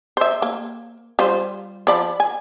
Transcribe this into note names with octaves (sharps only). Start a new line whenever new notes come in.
C5 E5
A#3
G3 F4 C5
F3 D5 B5
G#5